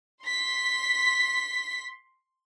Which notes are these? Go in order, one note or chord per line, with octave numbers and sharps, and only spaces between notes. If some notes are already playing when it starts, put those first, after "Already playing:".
C6 B6